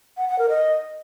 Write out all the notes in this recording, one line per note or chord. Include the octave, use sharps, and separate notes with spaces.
F#5
F#5
A#4
D#5